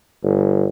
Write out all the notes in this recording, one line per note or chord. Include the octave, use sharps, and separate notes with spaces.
G1